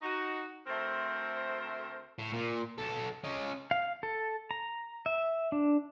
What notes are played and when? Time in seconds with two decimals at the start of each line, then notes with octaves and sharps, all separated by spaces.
0.02 D#4 F#4
0.67 D2 A3 C4 A#4 C5 E5
2.18 A2
2.33 A#2
2.78 B1 A4
3.24 C#4 D#5
3.71 F5
4.03 A4
4.51 A#5
5.06 E5
5.52 D4